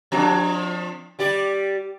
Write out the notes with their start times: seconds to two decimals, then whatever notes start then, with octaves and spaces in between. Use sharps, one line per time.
0.12 F3 C4 D4
1.19 G3 G4 D5